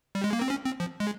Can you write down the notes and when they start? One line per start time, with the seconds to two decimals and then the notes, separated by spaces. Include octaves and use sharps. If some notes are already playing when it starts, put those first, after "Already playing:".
0.15 G3
0.24 G#3
0.33 A#3
0.41 C4
0.50 C#4
0.65 C4
0.80 F3
1.00 G#3